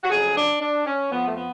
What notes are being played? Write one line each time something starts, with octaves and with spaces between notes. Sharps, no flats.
F#4
F2 C#3 F#3 G#4
D4
D4
C#4
F2 F3 B3
A3
B3